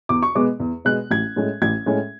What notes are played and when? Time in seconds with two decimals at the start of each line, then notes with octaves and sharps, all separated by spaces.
0.09 E2 D6
0.22 C#6
0.35 B2 G#3 B3 D6
0.60 E2
0.85 B2 G#3 B3 F#6
1.11 A1 G#6
1.36 A2 G#3 C#4
1.62 A1 G#6
1.86 A2 G#3 C#4